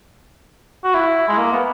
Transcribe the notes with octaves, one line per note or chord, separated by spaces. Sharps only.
F#4
E4
G#3
A#3
B3